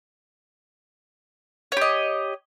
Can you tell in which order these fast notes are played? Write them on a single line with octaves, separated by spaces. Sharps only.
C#5 G4 D#5